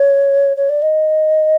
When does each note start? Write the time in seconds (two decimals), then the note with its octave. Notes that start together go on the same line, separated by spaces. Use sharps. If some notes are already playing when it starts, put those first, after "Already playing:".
Already playing: C#5
0.56 C#5
0.69 D5
0.81 D#5